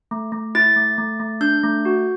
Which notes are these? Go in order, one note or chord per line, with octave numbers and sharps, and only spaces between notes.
A3
A3
E4 A6
A3
A3
A3
D4 G6
A3
F#4